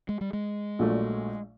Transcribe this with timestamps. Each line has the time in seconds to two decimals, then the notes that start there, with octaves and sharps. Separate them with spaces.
0.09 G#3
0.21 G3
0.33 G#3
0.79 A#1 A#2 F#3 A3 D4